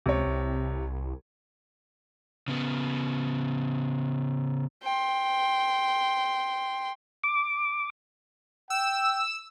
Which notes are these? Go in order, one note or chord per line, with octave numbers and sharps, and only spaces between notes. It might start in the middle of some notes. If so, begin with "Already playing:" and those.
C#2 C3 C#5
C2
C#3 B3
G5 C6
D6
G5 E6